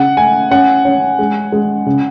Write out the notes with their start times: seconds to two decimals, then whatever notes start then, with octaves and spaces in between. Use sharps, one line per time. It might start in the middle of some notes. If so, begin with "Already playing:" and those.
Already playing: C#3 F#5
0.17 A3 G#5
0.51 C#4 F#5
0.85 C#4
1.19 G#3
1.52 G#3
1.86 C#3